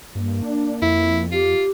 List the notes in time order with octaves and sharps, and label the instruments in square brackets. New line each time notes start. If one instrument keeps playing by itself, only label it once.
[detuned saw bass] G2 [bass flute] A#3
[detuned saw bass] D4
[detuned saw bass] F2 [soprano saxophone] E4
[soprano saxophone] F4 [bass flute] G4